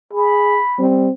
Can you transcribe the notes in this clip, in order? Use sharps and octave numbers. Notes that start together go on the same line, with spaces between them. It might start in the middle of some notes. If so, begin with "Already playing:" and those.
G#4 B5
G3 C4